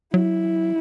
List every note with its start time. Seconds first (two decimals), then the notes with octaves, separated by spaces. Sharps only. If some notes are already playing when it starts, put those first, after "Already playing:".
0.13 F#3 E4